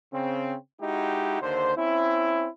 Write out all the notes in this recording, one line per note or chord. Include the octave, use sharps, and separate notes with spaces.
C#3 C4
G#3 D#4 E4 F#4 G4
D#2 D3 C5
C4 C#4 E4